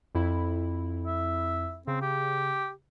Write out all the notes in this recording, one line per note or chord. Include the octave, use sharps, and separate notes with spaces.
F2 E4
E5
C#3 C4
G4